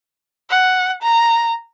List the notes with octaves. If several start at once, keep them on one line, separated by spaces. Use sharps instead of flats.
F#5
A#5